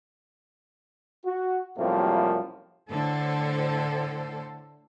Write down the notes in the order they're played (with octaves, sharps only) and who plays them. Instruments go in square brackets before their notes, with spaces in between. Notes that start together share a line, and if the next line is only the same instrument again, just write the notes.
[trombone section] F#4
F#2 A2 C3 F3 G3 A#3
[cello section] A2 D3 A4 C5